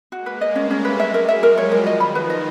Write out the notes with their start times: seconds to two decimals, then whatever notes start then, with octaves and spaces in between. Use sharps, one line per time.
0.12 G#3 A#3 F#4
0.26 B4
0.41 D#5
0.55 G3 A3 C#4
0.71 C#4
0.85 B4
0.99 F#3 G#3 E5
1.14 A#4
1.28 E5
1.43 F3 G3 A#4
1.58 C#5
1.72 A#4
1.86 D#3 F3 D#5
2.00 B5
2.15 B4
2.30 D#5